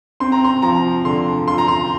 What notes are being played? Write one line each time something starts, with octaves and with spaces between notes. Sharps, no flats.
C4 C6
A#5
C6
F3 A#5
D3 C6
F4 C6
A#5
C6